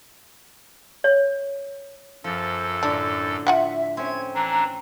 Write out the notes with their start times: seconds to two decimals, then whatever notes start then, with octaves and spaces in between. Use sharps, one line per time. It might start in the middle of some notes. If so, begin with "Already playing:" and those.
1.04 C#5
2.24 F#2 F3 A4
2.83 A2 D3 D4 D5
3.47 F4 E5 F#5 G5
3.97 C4 C#4 G#6
4.34 E3 D4 A#5